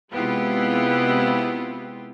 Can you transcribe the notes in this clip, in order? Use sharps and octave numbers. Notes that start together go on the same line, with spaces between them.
C3 G#3 B3 E4 F4 G4